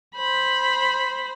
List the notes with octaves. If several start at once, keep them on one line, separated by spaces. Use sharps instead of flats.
C5 B5